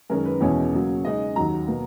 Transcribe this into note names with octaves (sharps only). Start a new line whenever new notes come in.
F#2 D#3 G#3 C#4 A#4
B4
E2 B2 G#3 C#4 E4 C#5
C#3 F#3 A#3
C#3 G#3 D#4 D#5
D#2 D#3 F#3 A#5
B2 A#3